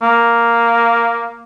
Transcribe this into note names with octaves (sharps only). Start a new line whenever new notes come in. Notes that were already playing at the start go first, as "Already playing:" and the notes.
A#3